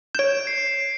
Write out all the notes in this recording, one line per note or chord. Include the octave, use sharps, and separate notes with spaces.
C#5 G6 D7 E7
C7